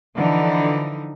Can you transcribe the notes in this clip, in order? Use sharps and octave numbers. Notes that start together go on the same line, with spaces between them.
D3 E3 F3 D#4